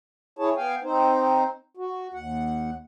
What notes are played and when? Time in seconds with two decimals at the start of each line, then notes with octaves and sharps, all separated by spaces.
0.39 E4 G#4 C#5 A5
0.56 B3 F5 G5 G#5
0.83 C4 D#4 C5
1.77 F#4
2.14 D#2 F#5